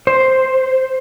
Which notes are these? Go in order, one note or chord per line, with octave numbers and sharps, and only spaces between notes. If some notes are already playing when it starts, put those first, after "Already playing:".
C5